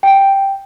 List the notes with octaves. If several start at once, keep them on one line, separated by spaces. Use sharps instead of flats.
G5